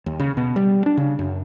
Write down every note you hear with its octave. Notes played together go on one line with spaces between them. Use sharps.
D#2
C#3
B2
G3
D4
C#3
F#2